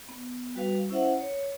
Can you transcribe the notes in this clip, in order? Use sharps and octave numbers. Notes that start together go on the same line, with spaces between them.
B3
G3 F#4 B4 F5
C#4 E4 C5 E5 F#5
C#5